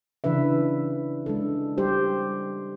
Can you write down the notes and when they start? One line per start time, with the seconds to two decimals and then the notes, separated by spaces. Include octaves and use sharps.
0.24 C#3 E3 D4 B4 E5
1.26 G#3 D4 A4
1.78 G3 G4 C5